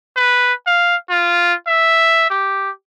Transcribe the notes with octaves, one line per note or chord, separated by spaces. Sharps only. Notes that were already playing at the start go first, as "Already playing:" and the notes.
B4
F5
F4
E5
G4